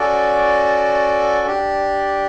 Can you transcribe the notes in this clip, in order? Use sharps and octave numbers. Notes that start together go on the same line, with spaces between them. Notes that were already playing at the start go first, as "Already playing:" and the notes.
Already playing: C#4 F#4 A4 D5
D4 G4 D5